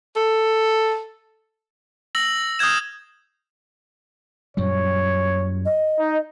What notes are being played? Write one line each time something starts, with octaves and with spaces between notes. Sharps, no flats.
A4
E6 A#6 F#7
D#6 F6 G6 G#6 E7
F#2 A#2 G3 C#5
D#5
D#4